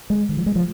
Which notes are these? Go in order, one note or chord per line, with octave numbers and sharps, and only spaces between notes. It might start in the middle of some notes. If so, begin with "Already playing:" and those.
G#3
D#3
F3
G#3
F3